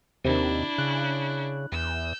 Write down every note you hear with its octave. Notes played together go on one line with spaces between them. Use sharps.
D#2 C3 D#3 D4 E4
C#3 F#6
E2 E6 G6